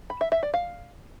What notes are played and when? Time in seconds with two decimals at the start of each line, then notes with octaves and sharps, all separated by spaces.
0.10 B5
0.21 E5
0.32 E5
0.43 D5
0.54 F5